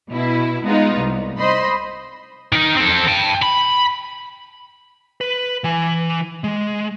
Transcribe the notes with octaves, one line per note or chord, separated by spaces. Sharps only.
B2 E4 B4
G#3 B3 D#4 F4
C2
C5 D#5 B5 C6
D#3 D#4
C4 A4
G5 A5
B5
B4
E3 G#5
G#3